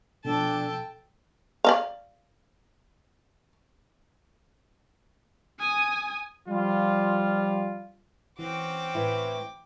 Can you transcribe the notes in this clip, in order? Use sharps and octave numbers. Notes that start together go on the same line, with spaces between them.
B2 F3 D4 A4 G5 A5
D5 D#5 F5
G#5 D#6
F3 G3 F4
E3 C4 C#4 F#4 G5 D6
A2 E4 B4